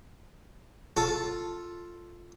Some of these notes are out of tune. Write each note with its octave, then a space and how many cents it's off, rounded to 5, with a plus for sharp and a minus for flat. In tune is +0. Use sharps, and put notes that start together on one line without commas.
F4 +0 A4 +0